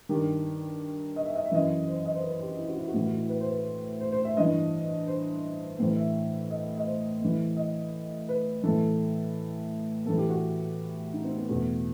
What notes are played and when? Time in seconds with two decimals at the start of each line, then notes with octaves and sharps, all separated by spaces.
0.09 G2 D#3 G4
1.16 D#5
1.26 E5
1.35 D#5
1.45 E5
1.52 F#2 E3 D#5
1.88 C5
2.06 D#5
2.14 C5
2.23 B4
2.40 G4
2.58 E4
2.68 F#4
2.77 E4
2.88 F#4
2.93 A2 E3 E4
3.06 F#4
3.17 E4
3.29 B4
3.41 C5
3.51 B4
4.01 C5
4.12 C5
4.25 E5
4.37 G2 E3 D#5
5.07 C5
5.79 A2 E3 C5
5.97 E5
6.50 D#5
6.77 D#5
6.86 C5
7.21 A2 E3
7.57 D#5
8.29 B4
8.63 A2 E3 A4
10.06 A2 A4
10.09 E3
10.18 G4
10.29 F#4
11.13 D#4
11.24 C4
11.36 B3
11.49 E2 B2 A3